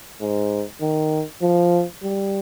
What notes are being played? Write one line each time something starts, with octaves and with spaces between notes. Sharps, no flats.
G#2
D#3
F3
G3